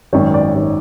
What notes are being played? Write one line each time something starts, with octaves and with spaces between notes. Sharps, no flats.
G#1 F#2 D#3 C#5
D5
G#1 D#3